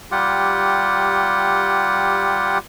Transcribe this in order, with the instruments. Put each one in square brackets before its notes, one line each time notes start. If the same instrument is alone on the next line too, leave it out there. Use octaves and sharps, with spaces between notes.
[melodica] G3 F4 G4 F#5